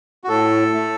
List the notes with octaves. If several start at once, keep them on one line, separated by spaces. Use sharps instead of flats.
F#4
A2 A4
A3